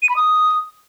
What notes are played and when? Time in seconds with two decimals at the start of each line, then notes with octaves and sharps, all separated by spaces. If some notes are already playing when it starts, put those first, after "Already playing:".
0.02 D#7
0.09 B5
0.16 D#6